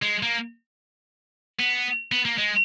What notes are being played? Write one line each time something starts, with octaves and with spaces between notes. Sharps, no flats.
G#3
A#3
B3
B3
A#3
G#3